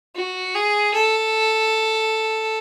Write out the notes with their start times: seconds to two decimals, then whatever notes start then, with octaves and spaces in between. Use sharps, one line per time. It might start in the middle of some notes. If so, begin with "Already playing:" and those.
0.16 F#4
0.55 G#4
0.94 A4